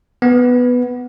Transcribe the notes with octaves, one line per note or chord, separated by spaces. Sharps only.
B3